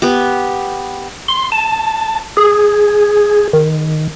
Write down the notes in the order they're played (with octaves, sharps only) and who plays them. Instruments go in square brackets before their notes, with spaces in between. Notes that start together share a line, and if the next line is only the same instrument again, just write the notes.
[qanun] B3 G4
[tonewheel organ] C6
A5
G#4
D#3